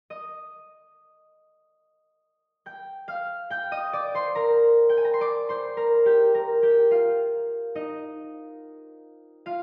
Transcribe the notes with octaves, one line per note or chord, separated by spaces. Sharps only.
D#5 D#6
G5 G6
F5 F6
G5 G6
D#5 D#6
D5 D6
C5 C6
A#4 A#5
G5
G#5
A#5
C6
D5 D6
C5 C6
A#4 A#5
G4 G5
A#4 A#5
G4 G5
F4 F5
D#4 D#5
F4 F5